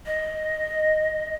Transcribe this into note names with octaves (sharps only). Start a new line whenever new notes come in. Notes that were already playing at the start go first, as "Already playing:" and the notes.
D#5